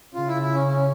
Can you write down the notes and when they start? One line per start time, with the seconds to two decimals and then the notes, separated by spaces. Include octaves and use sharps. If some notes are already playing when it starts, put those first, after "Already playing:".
0.14 C#3 F4
0.28 E4
0.42 E4
0.54 C#4
0.67 C#4